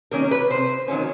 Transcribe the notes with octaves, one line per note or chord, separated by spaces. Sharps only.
D#3 F#3 A#3 C#4 A#4
B4
C3 C5
D#3 F#3 A#3 C#4